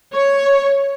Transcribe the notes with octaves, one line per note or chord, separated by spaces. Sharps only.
C#5